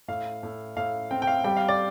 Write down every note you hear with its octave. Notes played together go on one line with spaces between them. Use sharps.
A2 F5
A2
A2 F5
C4 G5
G5
F5
G3 G5
F5
D5